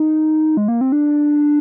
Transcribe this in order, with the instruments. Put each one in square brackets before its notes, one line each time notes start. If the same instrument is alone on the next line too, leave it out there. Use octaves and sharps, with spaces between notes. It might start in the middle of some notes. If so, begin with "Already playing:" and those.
Already playing: [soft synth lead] D#4
G#3
A#3
C4
D4